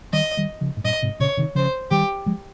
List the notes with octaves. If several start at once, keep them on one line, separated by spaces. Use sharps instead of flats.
D#3 G3 D#5
D#3 G3
C#3 F3
G#2
G2 A#2 D#5
G#2 C3
A#2 C#3 C#5
C3 D#3
C#3 F3 C5
D#3 G3 G4
F3 G#3